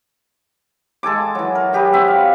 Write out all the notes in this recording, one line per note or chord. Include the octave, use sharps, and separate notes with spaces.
G#3 A4 G#5 D6
E3 F#3
A#4
F#3 G4 G#4 B4
C4 B4 E5
F5